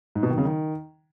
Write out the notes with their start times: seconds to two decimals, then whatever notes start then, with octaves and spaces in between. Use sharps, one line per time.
0.15 G#2
0.23 B2
0.30 D#3
0.38 C#3
0.45 D#3